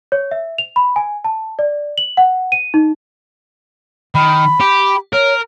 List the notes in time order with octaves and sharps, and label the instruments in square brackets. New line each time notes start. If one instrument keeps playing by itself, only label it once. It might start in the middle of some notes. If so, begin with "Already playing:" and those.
[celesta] C#5
E5
F7
B5
G#5
A5
D5
F#7
F#5
D#7
D#4
[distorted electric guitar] D#3 [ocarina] B5
[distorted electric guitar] G4
[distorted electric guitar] A#4 [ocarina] C#5